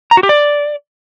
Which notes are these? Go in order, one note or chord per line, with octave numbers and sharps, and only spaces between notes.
A#5
F#4
G4
D5